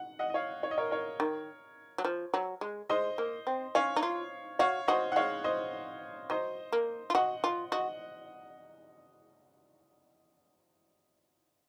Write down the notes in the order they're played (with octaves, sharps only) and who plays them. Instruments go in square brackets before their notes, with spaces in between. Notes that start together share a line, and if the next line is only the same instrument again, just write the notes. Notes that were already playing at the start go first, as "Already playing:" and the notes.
Already playing: [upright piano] F#5
D#5 F#5
D#5
C#5 F5
C#5
D#5
A#4 C#5
A#4 C#5
[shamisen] D#3
F#3
F3
F#3
G#3
[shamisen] G#3 [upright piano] C5 D#5
[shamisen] A#3
C4
[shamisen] C#4 [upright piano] C#5 F5
[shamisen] D#4
F4
[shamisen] F#4 [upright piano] C#5 F5
[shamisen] F#4 [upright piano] C5 D#5
[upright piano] F#5
[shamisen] G#3 [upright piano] C#5 F5
[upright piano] C5 D#5
[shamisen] F#3 [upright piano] C5 D#5
[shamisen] A#3
F4
[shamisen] F#4 [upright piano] D#5 F#5
[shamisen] F4
[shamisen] F#4 [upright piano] D#5 F#5